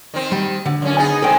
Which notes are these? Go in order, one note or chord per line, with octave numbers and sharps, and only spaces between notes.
D#3 C4
G3
D3
F#2 A2 C#4
B3 D#4 G#4 G#5
C3 D#3 G#3 A4 G5